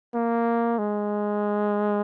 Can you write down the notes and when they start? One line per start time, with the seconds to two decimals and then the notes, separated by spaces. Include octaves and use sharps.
0.14 A#3
0.79 G#3